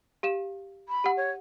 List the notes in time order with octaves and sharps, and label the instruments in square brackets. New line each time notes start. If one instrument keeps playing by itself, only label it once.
[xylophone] G4 F5 E7
[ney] B5
[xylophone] G4 F#5
[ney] C#5